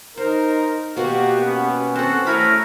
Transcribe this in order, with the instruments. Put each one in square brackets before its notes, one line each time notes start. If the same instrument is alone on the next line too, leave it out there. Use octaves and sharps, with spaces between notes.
[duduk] D#4 [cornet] A#4 [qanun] C5
[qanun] B2 A#3 [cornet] F#4 [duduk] G4
[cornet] B3 [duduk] C#4
[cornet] C4 [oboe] F#4 [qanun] A4 C5
[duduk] A3 [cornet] E4 [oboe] A#4 [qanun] B4 C#5 B5